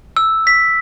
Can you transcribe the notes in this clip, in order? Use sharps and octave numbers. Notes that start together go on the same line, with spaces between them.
E6
B6